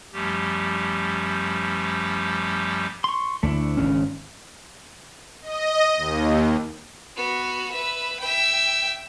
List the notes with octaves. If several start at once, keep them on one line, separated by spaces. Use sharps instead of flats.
F#2 F3 G3 A3 G4
C6 C#6
D2 A3 D4 E4
G#1 C#3 C#4
D#5
D#2
B3 F#4
B4 E5
E5 G5